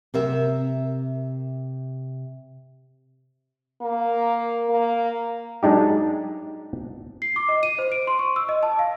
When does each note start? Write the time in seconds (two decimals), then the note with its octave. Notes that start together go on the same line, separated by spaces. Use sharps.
0.14 C3 A#4 E5
3.81 A#3
4.69 A#3
5.63 F#3 G#3 D4 D#4 G4
7.22 C7
7.36 D6
7.49 D#5
7.63 D#7
7.78 C5
7.92 D7
8.07 C6
8.19 C#6
8.36 E6
8.49 D#5
8.63 A5
8.79 F5